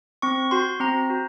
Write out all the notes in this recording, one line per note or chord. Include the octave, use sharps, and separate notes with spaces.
C4 C#6
F#4 C6
C4 A#5
F#4